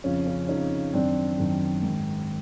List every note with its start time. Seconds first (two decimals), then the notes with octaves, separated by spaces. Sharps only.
0.04 F2 C#3 F3 C#4
0.26 C#4
0.48 F2 C#3 F3 C#4 D#4
0.94 F#2 D#3 C4 D4
1.38 F#2 D#3
1.83 G#2 D#3